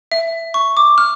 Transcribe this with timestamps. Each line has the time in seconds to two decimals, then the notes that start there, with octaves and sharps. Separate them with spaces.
0.12 E5
0.54 C#6
0.77 D6
0.98 F6